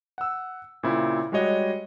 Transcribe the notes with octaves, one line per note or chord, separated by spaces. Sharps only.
F#5 E6
A#2 C#3 C4 E4 C5
G3 G#3 F#4 C#5 D#5